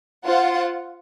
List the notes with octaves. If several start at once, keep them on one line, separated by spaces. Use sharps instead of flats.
F4 C5 F#5